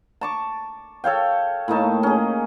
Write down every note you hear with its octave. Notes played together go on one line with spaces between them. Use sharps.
A5 C#6 D6
A4 C#5 F5 G5
A2 A#3 D#4 A5
C#4 G#4